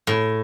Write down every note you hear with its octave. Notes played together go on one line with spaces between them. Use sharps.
A2